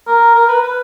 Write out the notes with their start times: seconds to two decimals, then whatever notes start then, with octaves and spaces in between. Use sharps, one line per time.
0.07 A#4
0.35 A#4
0.49 B4
0.63 B4